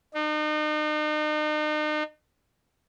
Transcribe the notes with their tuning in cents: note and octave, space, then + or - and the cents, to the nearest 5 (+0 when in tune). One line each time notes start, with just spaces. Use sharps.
D#4 -40